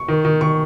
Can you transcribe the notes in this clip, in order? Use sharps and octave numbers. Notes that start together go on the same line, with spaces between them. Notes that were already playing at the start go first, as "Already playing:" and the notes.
Already playing: C#6
D#3
D#3
D#3 C#6